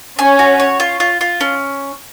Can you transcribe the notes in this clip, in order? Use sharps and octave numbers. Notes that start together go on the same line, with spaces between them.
C#4 G#5
F#4
C#5
F4
F4
F4
C#4